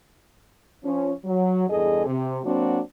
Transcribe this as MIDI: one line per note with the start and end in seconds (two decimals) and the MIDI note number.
0.83 1.11 53
0.83 1.11 61
1.25 1.67 54
1.68 2.06 40
1.68 2.06 43
1.68 2.06 68
1.68 2.06 69
1.68 2.06 75
2.06 2.38 48
2.44 2.79 54
2.44 2.79 58
2.44 2.79 60
2.44 2.79 62
2.44 2.79 66